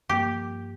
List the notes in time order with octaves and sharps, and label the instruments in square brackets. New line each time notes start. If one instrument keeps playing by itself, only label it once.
[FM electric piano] G2 F3 A#3 [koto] G4